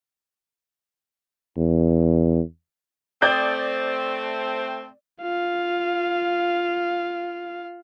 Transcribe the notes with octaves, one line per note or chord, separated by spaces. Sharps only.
E2
A3 C4 D5 D#6 G6
F4 F5